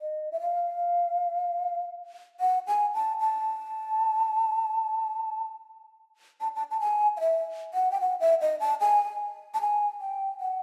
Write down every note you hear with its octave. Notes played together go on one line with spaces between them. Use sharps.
D#5
E5
F5
F#5
G#5
A5
A5
A5
A5
A5
G#5
F5
E5
F#5
G5
F#5
E5
D#5
A5
G#5
A5
G#5
G5
F#5